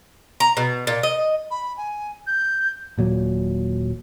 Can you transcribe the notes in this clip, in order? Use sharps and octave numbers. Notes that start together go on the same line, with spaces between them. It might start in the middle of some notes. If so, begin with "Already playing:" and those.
A#5
B2
A#2
D#5
B5
G#5
G6
D#1 A#2 F#3